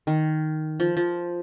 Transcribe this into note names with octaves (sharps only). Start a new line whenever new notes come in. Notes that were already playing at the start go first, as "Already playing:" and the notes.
D#3
F3
F3